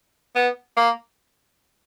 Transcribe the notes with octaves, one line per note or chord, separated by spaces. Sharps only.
B3
A#3